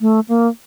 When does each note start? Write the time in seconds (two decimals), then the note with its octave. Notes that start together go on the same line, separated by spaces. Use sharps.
0.01 A3
0.29 A#3